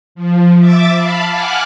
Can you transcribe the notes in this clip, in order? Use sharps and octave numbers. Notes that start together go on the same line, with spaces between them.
F3
E5 D6 E6 A6
F5 A5 B5
F#5 G#5 D6 F6 F#6